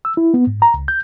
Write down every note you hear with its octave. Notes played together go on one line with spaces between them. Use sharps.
E6
E4
B3
G#2
A#5
C#2
G6